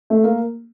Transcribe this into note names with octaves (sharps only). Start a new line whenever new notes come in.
A3
A#3